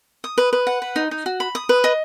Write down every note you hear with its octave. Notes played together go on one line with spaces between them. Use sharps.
D#6
B4
B4
F#5
B4
D#4
D#4
F#4
B5
D#6
B4
D#5